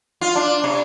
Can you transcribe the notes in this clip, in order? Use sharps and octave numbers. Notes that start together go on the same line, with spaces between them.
F4
D4
C3